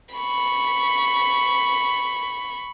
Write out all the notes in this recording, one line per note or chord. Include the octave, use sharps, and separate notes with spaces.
B5 C#6